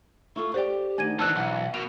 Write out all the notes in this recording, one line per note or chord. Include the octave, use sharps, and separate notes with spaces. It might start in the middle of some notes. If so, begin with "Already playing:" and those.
E4 F4 A4 C#6
G4 C5 D5 F#5 G5
D2 D#3 D4 G#5 G#6 D#7
D#3 E3 C4 D4 A5 E6 F#6
B1 F#5
B2 A#4 F7